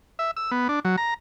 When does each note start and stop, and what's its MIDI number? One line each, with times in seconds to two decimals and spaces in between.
0.19 0.31 76
0.37 0.51 88
0.51 0.68 59
0.69 0.80 62
0.85 0.96 54
0.98 1.14 82